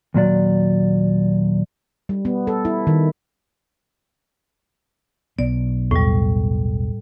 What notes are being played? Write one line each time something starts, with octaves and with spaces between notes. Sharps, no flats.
D#2 A#2 F#3 D5
G3
B3
A4
E4
D#3
B1 B3 D5
E2 A2 G3